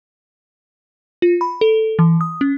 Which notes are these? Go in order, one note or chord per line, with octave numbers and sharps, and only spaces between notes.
F4
B5
A4
E3
D#6
C#4